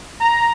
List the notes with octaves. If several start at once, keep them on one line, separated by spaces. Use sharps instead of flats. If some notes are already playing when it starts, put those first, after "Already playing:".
A#5